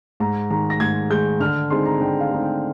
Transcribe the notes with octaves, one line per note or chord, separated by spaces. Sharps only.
G#2 A#5
D#3 G#3 A#5
A#6
G#2 G#6
D#3 G#3 G6
D3 F6
G#3 C4 D#4 C6
A#5
D3 G5
F5
G#3 C4 D#4
G5